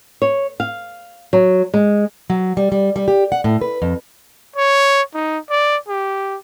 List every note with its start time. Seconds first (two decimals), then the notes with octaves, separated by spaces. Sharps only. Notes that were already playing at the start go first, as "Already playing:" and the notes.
0.22 C#5
0.60 F5
1.33 F#3
1.74 G#3
2.30 F#3
2.57 G3
2.72 G3
2.96 G3
3.08 G4
3.32 F#5
3.44 A2
3.61 B4
3.82 F2
4.56 C#5
5.14 D#4
5.50 D5
5.88 G4